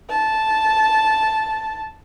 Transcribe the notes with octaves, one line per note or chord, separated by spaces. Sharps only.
A5